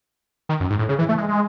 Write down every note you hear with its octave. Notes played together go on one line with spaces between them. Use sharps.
D#3
F#2
G#2
A2
C#3
E3
A3
G#3
G#3